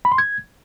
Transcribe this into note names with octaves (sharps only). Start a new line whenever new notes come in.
B5
C6
G#6